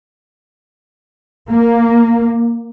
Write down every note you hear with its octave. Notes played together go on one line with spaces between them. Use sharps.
A#3